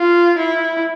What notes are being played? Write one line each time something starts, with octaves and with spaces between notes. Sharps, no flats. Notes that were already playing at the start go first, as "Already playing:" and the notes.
Already playing: F4
E4